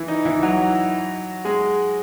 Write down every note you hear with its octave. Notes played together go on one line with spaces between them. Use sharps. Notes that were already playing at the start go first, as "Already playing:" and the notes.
Already playing: E3 E4
D#4
E3 E4
F#3 F#4
G#3 G#4